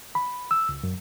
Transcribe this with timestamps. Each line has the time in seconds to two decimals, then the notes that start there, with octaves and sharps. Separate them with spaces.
0.15 B5
0.51 E6
0.69 C#2
0.83 F#2